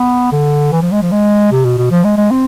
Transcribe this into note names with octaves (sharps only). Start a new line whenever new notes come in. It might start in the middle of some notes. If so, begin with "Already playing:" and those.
Already playing: B3
D3
E3
F3
G#3
F3
G#3
C3
B2
B2
F3
G#3
G#3
C4